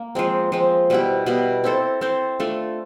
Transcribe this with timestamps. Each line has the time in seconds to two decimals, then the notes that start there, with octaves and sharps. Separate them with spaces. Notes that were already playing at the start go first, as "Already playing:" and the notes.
Already playing: A#3
0.15 F3 G#3 C4
0.52 F3 G#3 C4
0.90 B2 G3 B3 E4
1.26 B2 G3 B3 E4
1.64 C4 E4 A4 C5
2.01 C4 E4 A4 C5
2.40 A3 D4 F4 A4